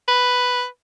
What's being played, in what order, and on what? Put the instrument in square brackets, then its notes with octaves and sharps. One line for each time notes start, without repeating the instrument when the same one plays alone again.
[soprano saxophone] B4